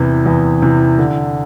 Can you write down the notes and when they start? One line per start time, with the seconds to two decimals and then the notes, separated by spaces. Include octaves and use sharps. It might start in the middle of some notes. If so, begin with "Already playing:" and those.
Already playing: E2 C3 E3
0.26 E2
0.62 C3 E3
0.99 D3